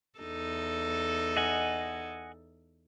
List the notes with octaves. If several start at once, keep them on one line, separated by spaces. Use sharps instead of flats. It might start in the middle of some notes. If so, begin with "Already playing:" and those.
E2 D#4 A4
D#5 F#5 G#5